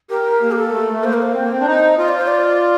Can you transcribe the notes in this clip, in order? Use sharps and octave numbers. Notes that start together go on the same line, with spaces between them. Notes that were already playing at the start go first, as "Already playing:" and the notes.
G4 A#4
A#3
G4
A4
A3
A3
A#3 C5
A#4
C5
C4
A#3
C4
D4
D#4
F4 D#5
D5
C5
D5